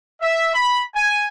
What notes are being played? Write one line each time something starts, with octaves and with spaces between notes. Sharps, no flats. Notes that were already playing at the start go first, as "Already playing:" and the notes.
E5
B5
G#5